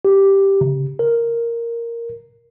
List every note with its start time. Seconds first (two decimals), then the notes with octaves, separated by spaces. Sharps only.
0.05 G4
0.61 C#3
0.99 A#4